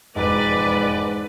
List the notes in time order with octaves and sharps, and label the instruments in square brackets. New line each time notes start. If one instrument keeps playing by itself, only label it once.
[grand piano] E1 F2 [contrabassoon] G#2 [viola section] B4 D5